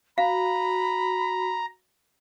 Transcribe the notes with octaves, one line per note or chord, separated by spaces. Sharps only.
F#4 F5 A#5 B5